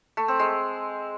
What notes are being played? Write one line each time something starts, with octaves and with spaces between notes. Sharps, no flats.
A3
C4
G#3